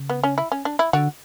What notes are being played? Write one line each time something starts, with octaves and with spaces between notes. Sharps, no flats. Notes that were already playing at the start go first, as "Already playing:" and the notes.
Already playing: C#3
B3
C#4
E4
C#4
D4
E4
D3 F#4